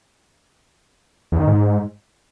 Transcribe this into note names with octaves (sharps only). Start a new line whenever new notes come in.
E2
D#3
G#2